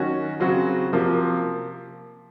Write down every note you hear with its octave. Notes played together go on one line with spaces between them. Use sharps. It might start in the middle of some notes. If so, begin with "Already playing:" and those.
Already playing: D#3 F#3 C#4 F#4
C#3 F#3 C4 F#4
C3 F3 A#3